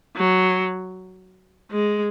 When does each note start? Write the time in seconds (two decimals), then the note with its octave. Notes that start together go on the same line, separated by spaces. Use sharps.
0.16 F#3
1.71 G#3